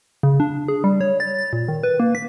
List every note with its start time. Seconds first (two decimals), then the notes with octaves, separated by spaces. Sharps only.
0.23 C#3
0.40 D4
0.68 G#4
0.84 G3
1.01 C#5
1.20 A6
1.38 A6
1.53 A#2
1.68 D#3
1.83 B4
2.00 A#3
2.15 B6